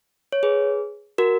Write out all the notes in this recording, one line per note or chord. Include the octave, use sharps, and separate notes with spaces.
C#5
G#4 B4
F#4 A#4